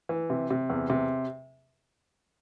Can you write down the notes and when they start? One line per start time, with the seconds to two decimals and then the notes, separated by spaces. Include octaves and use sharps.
0.09 E3
0.30 C3
0.50 C3
0.70 E2
0.90 C3